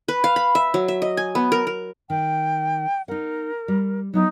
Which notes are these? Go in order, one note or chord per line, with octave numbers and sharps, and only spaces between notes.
B4
F5
B5
E5
F#3
E5
D#5
G#5
B3
A#4
A#4
D#3 G5
D#4 A#4 F#5
G3
F#3 B3 D#4 E4